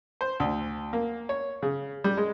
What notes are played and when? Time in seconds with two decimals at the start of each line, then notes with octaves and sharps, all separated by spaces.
0.21 C5
0.40 D2
0.93 A#3
1.29 C#5
1.62 C#3
2.04 G3
2.17 G#3